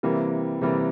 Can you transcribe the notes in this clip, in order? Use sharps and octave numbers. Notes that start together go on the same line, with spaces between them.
C3 E3 G3 A#3
C3 E3 G3 A#3